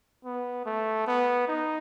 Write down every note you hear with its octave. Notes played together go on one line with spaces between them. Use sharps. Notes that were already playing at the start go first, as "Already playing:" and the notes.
B3
A3
B3
D#4